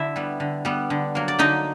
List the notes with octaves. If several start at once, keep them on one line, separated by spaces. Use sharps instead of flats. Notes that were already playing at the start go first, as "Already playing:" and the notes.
Already playing: D3 E4 E5
G3 B3
D3
G3 B3
D3
F#3 A#3
D5
D3 D#4 D#5